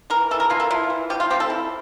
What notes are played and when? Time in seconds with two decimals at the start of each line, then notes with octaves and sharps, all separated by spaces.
0.10 E3 A#4
0.31 E3 A4
0.40 A#4
0.50 A#3 F4
0.60 A4
0.70 E4 F4
0.90 E3
1.10 F3 G4
1.20 F4
1.30 C4 G4
1.40 A4
1.50 E4